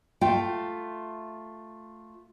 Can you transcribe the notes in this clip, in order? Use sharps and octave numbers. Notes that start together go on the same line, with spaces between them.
A3 F4 G5